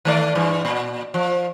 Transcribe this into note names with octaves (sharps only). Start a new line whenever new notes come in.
D#3 A3 D5
G2 E3
A#2
F3